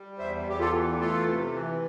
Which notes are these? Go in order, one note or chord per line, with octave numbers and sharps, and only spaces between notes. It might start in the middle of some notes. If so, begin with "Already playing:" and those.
Already playing: G3
E2 C5 E5
E2 G4
F4 A4
E3
A3 F4 A4
C3
E3